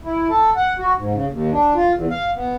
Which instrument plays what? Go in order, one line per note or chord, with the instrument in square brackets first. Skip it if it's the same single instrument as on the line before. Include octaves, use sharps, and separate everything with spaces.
[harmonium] E4
A4
F#5
F#4
G#2
C#3
D#2
D4
F4
E2
F5
B3